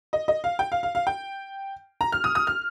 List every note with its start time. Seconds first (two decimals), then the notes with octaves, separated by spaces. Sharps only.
0.13 D#5
0.28 D#5
0.44 F5
0.59 G5
0.72 F5
0.83 F5
0.95 F5
1.07 G5
2.01 A#5
2.12 F6
2.24 D#6
2.35 D#6
2.47 F6